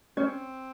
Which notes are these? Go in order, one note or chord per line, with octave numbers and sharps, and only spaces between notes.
C4 C#4 C#5